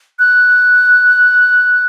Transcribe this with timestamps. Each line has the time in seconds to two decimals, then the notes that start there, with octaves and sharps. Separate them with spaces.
0.19 F#6